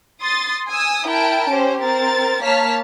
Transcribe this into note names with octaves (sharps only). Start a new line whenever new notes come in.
C6 D#6 A6
G#5 D#6 E6
E4 A#4 G5 A5 D7
C#4 G4 C5
C4 A#4 A6
A#3 C#5 A5 F6 B6